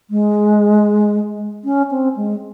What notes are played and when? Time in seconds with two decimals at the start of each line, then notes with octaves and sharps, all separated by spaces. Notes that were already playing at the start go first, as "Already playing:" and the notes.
0.10 G#3
1.64 C#4
1.90 C4
2.16 G#3